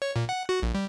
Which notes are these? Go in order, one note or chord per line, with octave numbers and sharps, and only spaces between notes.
C#5
A#2
F#5
F#4
A#1
G3